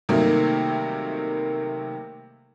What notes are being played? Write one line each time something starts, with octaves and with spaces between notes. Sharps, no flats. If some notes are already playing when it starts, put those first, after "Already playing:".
C3 D#3 F#3 G3 A3 A#3